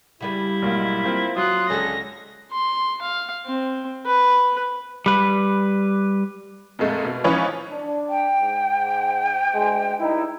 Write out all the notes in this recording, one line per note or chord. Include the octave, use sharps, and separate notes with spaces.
C#3 G3 E4 B4
B1 G#2 A#3
A#3 C4 F4
F#3 F4 D#6 F#6
C#2 D3 C#4 G#4 A4 A#6
C6
F5
C4
B4
G3 B4
F2 A#2 G#3 A3
B2
E3 F3 C#4 D#4 B4 C#5
D4
G5
G#2
D2 G#3
G2 D#4 E4